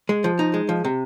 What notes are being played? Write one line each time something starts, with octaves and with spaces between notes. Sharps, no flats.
G#3
F3
D#4
G#3
F3
C3